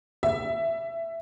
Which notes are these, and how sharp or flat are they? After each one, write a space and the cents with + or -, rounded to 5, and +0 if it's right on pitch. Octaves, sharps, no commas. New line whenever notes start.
E5 +15